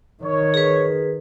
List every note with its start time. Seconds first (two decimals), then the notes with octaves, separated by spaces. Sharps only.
0.24 D#3 C#5
0.54 G#4 B4